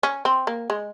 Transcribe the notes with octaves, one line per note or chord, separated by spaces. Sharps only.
C#4
C4
A#3
G#3